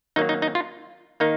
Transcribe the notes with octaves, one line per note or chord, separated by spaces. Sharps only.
D#3 F#3 A#3 D#4
D#4
D#4
F4
D#3 A#3 D#4